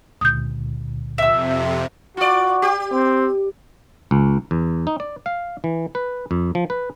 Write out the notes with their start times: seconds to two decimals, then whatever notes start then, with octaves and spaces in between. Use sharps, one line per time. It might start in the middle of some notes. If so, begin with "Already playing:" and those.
0.21 C#2 A#2 D3 D#6 G6
1.18 F2 C3 E5 E6
2.17 F4 F#4 D5
2.62 G4
2.92 C4
4.11 C#2
4.51 E2
4.87 D#4
5.00 D5
5.26 F5
5.64 E3
5.95 B4
6.31 F2
6.55 F3
6.70 B4